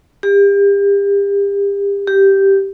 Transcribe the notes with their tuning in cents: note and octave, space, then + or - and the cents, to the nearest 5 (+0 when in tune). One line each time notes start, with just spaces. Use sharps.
G4 +35
G4 -5